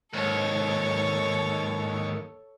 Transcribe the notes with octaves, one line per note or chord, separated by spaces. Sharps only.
D#2 G#2 A4 C#5